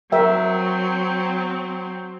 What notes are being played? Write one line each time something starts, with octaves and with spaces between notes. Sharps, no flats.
F#3 C4 A#4 E5 G5